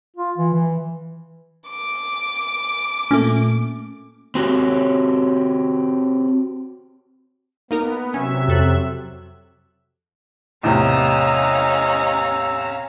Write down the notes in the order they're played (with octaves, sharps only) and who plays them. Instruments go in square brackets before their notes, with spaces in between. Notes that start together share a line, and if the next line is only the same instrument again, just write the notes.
[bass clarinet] F4
E3
E3
[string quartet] D6
[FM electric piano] A#2 A3 [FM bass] C#4
[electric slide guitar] C4 F#4 G4 C#5
[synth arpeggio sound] A#3 D#4 A#4 [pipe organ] B3
[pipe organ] C3 F#3 E5 [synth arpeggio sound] C#4
[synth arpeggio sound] F2 A4 F#6
[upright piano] E2 A2 C3 [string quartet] C#4 F5 A#5 [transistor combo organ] D#5 [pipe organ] E6